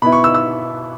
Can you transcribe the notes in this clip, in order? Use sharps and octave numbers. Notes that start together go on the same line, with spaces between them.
B2 B3 E4 B5
C#6
E6
E6